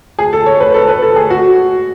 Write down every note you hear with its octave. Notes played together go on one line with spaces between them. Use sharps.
G#4
A4
C#5
B4
A4
B4
A4
G#4
F#4